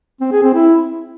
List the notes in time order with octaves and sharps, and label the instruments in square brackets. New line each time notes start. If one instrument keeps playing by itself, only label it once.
[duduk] C4
G#4
C4
E4